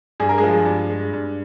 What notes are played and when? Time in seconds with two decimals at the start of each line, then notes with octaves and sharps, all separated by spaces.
0.20 G2 G#4
0.29 A#4
0.38 G#3 G#4
0.43 F3
0.66 G2
0.90 G#3
1.13 G2